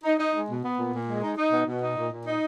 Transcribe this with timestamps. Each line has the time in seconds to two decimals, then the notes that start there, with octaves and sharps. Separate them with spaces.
0.04 D#4
0.18 D#4
0.34 G#3
0.48 B2
0.63 B3
0.78 A#2
0.93 A#2
1.07 G#3
1.23 D#4
1.37 D#4
1.51 B2
1.66 B2
1.81 D#4
1.96 A#2
2.11 A#2
2.26 D#4